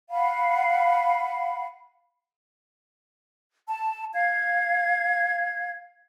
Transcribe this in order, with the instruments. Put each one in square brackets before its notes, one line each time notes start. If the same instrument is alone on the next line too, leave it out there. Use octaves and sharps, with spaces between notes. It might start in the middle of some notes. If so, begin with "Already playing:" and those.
[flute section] F5 F#5 B5
A5
F5 G#6